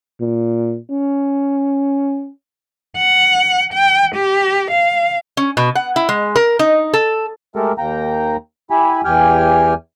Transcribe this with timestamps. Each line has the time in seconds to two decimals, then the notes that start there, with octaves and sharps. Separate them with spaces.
0.21 A#2
0.91 C#4
2.98 F#5
3.74 G5
4.16 G4
4.71 F5
5.37 C#4
5.57 B2
5.75 F#5
5.96 E4
6.09 G#3
6.36 A#4
6.59 D#4
6.93 A4
7.56 G#3 A3 G4 A4 A#4
7.78 D#2 A#3 G5 A#5
8.71 E4 G4 G#5 B5
9.05 E2 G4 G5 G#5 F6